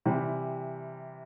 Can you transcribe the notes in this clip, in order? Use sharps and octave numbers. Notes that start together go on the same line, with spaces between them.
C3 E3 G3